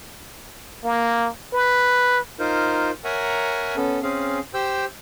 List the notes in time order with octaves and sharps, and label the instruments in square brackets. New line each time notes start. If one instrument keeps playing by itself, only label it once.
[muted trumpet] A#3
B4
[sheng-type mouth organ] D#4 F4 A#4 C5
A#4 C#5 E5 F#5 G#5 A#5
B3 C#4 A4
C4 C#4 G#4 F5
G4 C5 G5 E6